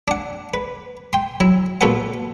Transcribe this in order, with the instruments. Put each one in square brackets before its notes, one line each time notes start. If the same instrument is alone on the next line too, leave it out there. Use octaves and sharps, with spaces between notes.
[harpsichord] D4 F#5
B4
G5 C6
F#3 E4
A#1 B2 F4 A4 B4 F#5